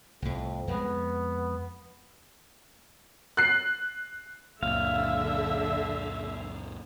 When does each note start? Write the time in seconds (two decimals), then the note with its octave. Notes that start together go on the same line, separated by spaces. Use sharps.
0.22 C2 F2 A2
0.67 F2 G#3 B3
3.37 F#6 C7
4.63 C#2 F#2 A#2 D3 E5 F5